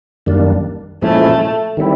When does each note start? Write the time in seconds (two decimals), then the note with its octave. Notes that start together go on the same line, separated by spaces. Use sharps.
0.26 F#2 D#3 G3 A#3 D4
1.02 A#2 F3 G#3 A3 C#4 E4
1.77 D#3 G3 C4 E4